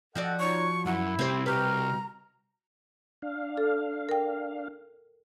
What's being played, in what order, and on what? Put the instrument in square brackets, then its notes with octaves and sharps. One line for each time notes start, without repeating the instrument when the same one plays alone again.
[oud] F3 F#4 D5 [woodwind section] A4 D#5 F#5
[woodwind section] D#4 F4 C#5 [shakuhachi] C#6
[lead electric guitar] F#2 [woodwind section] E4 [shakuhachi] F#5
[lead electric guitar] C2 [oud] C4 C5 [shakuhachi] G4
[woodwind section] B2 F#4 F6 [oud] G4 B4 [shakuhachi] A#5
[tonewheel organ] D4 F5
[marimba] A4
A#4 G5